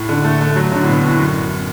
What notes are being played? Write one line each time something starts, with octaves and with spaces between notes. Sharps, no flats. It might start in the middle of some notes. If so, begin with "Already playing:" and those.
Already playing: A2
D3
A3
A3
F#3
D3
A2
B2
A2
F#2